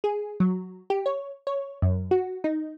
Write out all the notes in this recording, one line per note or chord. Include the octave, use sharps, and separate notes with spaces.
G#4
F#3
G4
C#5
C#5
F#2
F#4
D#4